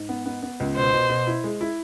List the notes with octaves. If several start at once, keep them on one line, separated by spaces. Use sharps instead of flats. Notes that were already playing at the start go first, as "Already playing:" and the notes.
Already playing: G#2
B3
B3
B3
C#2
B2 C5
B2
B2
E4
G#3
E4